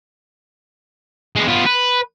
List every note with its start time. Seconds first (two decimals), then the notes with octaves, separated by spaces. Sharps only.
1.36 G#3 B3
1.48 B3 F4
1.66 B4